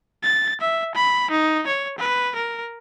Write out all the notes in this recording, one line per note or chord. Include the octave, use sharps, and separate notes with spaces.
A6
E5
B5
D#4
C#5
B4
A#4